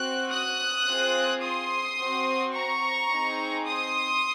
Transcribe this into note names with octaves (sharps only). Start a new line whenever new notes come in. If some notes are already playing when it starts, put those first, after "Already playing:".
Already playing: C4 F#4 F#6
D#6 F#6
C4 F4 G#4
C6 D#6
C4 F#4
A#5 C#6
C4 D#4 G#4
C6 D#6